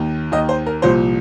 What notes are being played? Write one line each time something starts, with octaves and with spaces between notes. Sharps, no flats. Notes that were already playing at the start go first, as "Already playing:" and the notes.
Already playing: D#2 D#3
D#2 D#3 D#5
C5
A#4
C2 A#2 F3 C5